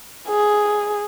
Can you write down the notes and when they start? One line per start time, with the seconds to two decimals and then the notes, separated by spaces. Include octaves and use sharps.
0.28 G#4